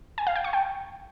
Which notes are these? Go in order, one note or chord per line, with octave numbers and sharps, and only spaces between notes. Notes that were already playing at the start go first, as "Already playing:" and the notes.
G#5
F5
G5
C#6
G5